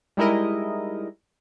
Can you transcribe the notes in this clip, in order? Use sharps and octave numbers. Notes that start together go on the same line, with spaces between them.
G3 G#3 D#4 E4 A#4 D#5